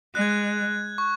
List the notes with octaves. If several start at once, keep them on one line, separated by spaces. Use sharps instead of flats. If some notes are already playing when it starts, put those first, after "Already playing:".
G#3 F#6
G#6
F#6
C#6